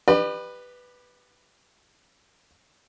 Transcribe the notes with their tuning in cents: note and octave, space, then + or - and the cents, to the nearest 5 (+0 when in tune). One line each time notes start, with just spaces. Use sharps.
G4 +0 B4 +0 D5 +45